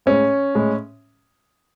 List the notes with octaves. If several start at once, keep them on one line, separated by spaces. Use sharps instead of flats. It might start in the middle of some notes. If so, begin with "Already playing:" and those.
A2 G#3 C#4
A2 G#3